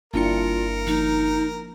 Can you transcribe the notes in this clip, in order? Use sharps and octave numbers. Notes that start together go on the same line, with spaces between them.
G1 A#3 D4 E4 F4 A#4 C#7
F3 A#3 D#4